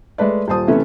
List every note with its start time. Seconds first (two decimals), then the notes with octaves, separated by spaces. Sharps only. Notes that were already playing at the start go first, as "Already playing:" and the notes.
0.18 G#3 A3 B4 D5
0.48 D#1 F4 C5 A5 D#6
0.68 C3 E3 A3 B3 C#4 A4